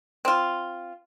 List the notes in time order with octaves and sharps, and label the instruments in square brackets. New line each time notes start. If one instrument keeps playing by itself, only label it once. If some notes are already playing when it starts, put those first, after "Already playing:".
[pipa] C4 F4